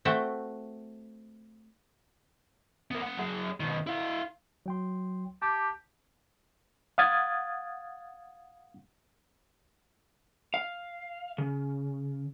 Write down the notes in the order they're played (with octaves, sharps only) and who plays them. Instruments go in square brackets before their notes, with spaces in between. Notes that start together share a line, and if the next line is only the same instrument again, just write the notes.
[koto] A3 C4 F#4 E5 F#5 G5
[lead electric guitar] B3 A#4
A#3 F#5
F#3 G#4
B2 D#3
E4 F5
[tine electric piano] F#3 G5 C6
[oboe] G4 [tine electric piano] A5 D6
[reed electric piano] F5 F#5 D#6 G#6 A6
[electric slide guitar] F5
C#3